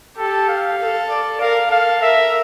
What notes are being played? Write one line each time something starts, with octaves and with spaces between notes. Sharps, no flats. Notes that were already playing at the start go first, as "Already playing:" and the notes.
G4 A4
F5
A4
D5
A#4 F5
A4 F5
A#4 E5